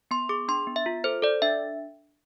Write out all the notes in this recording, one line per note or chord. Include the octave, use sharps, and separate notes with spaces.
B3 C6
G#4 D6
D4 C6
B3
E5
F4
A4 C5
A4 D5
D4 E5